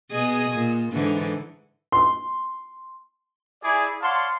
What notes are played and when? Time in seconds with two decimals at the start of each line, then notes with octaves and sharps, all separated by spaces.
0.12 B2 G#4 D#5
0.51 A#2
0.93 G#2 D3 E3
1.92 C6
3.63 E4 G#4 D5
4.01 C#5 D5 F5 F#5 A5 C6